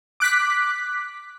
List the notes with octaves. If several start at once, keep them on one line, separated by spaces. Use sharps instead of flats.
D6 F#6 B6